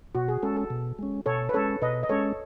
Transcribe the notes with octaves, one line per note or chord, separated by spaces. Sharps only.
B2 F#4
G#4
G#3 C#4 A4
A4
B2
G#3 C#4
B2 A4 C#5
B4
G#3 C#4 A4 C#5
B2 B4 D#5
D#5
G#3 C#4 A4 C#5